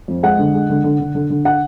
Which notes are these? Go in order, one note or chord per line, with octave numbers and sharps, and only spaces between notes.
F2
G#3 F#5
D3
G#3
D3
D3
D3
D3
D3
F#5